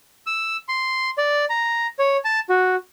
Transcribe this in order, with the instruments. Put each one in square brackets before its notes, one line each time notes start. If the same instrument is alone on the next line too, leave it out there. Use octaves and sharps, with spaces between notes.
[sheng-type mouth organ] E6
C6
D5
A#5
C#5
A5
F#4